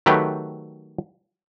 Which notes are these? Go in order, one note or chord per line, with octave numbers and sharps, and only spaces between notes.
D#3 F#3 A3 G4 B4